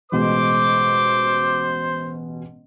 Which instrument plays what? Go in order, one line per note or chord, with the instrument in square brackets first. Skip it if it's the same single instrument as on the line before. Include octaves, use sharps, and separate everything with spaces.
[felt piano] A1 B2 G#3 [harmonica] C5 [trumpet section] D6